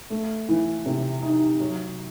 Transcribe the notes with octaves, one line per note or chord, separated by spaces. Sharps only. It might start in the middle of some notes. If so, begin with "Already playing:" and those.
A3
E3
C3
D#4
F#3